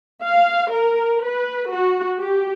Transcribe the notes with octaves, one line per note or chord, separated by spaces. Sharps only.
F5
A#4
B4
F#4
G4